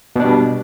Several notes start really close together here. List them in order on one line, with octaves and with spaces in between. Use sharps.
B2 D4 G3